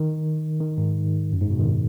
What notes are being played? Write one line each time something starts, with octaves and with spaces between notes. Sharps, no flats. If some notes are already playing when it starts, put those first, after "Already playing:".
Already playing: D#3
D#3
G#2
F#2
G#2
B2
D#3